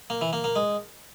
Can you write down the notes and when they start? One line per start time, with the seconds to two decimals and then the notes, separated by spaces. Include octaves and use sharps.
0.10 A#3
0.21 E3
0.33 A#3
0.44 A#3
0.56 G#3